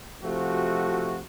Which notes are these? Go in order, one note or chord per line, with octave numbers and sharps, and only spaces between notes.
C3 F3 A3 F#4